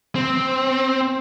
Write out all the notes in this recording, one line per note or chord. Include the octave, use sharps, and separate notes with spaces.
C4